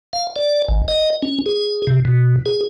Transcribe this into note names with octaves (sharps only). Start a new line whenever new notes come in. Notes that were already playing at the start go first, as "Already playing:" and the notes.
F5
D5
G#1
D#5
C#4
G#4
C3
B2
G#4